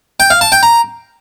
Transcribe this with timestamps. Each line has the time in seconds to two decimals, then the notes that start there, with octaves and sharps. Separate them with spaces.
0.20 G5
0.30 F5
0.41 A5
0.52 G5
0.63 A#5